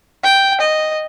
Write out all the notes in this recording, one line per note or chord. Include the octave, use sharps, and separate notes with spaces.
G5
D#5